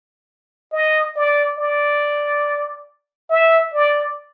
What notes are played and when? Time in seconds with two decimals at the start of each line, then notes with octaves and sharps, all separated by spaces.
0.72 D#5
1.16 D5
1.59 D5
3.30 E5
3.74 D5